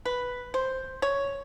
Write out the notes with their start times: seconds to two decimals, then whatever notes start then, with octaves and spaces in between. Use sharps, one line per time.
0.05 B4
0.54 C5
1.02 C#5